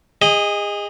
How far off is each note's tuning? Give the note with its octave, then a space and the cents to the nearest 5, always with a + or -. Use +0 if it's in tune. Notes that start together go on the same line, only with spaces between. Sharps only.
G#4 -30 D#5 +0